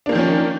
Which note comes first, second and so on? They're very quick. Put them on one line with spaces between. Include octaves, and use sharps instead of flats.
D4 A#3 D#3 F3 C#4